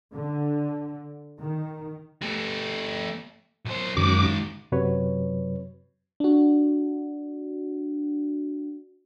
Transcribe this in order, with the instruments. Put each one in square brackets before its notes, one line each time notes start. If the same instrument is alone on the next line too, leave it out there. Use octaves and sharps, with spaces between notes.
[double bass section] D3
D#3
[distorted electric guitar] A3 G4
B1 C5
[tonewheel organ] F#2 D6 [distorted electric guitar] D#3 G#3
[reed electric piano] F#2 C3 F#3 B4 C#5
[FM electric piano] D4 F#4